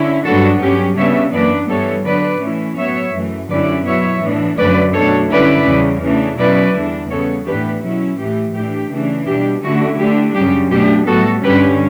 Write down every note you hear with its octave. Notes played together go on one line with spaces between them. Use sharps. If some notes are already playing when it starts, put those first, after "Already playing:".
Already playing: D3 C#4 E4
G2 F#3 B3 D4 F#4 A4
G2 F#3 C#4 G4
C#3 G3 B3 D4 C#5 E5
F#2 E3 B3 D4 B4 D5
G2 E3 G3 B3 A4 C#5
D3 F#3 B3 D4 B4 D5
A2 E3 A3 C#4 E4
A2 F#3 B3 C#5 E5
F#2 E3 A3
F#2 D3 G3 C#4 E4 B4 D5
B2 F#3 B3 E4 C#5 E5
A2 E3 B3 D4
F#2 D3 F#3 A3 C#4 B4 D5
B2 A3 D4 A4 C#5
D3 G3 C#4 E4 B4 D5
E2 C#3 G3
C#3 E3 A3 D4
B2 F#3 C#4 E4 B4 D5
E2 D3 G3 D4
C#3 G3 B3 A4 C#5
A2 E3 B3 D4 G4 B4
B2 F#3 C#4 E4
A2 E3 A3 G4
A2 E3 A3 D4 G4
C#3 E3 A3 D4
B2 G3 D4 G4
D3 A3 C#4 E4 F#4
D3 A3 D4 G4
F#2 C#3 G3 G4
B2 A3 D4 G4
A2 G3 B3 F#4 A4
G2 D3 G3 C#4 G4 B4